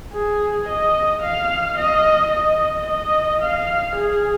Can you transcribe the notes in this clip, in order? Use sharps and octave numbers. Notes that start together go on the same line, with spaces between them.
G#4
D#5
F5
D#5
D#5
D#5
F5
G#4